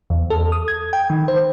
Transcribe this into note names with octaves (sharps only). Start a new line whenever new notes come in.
E2
A4
D#6
G#6
G5
D#3
C5